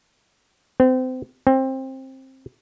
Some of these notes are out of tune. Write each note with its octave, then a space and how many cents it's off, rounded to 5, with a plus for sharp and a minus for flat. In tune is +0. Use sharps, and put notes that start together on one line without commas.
C4 -30
C4 +20